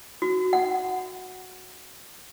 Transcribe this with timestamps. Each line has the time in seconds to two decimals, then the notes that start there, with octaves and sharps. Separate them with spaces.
0.22 F#4
0.53 F#5